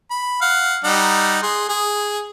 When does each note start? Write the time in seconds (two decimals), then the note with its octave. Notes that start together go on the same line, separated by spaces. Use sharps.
0.11 B5
0.41 F5 F#5
0.84 G3 D#4 F#5
1.43 G#4 C6
1.69 G#4